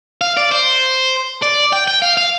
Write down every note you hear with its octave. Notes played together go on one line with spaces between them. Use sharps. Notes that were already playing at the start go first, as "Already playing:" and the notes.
F5
D5
C5
D5
G5
G5
F5
F5